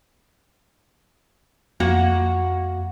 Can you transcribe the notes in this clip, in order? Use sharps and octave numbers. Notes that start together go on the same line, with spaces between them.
F2 A#3 F#4 F#5